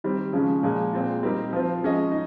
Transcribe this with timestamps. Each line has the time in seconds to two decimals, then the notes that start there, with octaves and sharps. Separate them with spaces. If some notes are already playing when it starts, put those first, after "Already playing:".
0.04 D#3 G3 C4
0.33 C#3 F3 G#3 C#4
0.63 A#2 F3 G#3
0.93 A#2 G#3 C4 F4
1.23 G3 C4 D#4 G4 A#4
1.53 F3 C4 F4 C5
1.82 F3 G#3 C#4 G#4 D#5
2.11 D#4